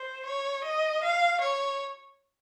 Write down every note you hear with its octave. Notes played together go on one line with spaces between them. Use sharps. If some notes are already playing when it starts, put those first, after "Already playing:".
Already playing: C5
C#5
D#5
F5
C#5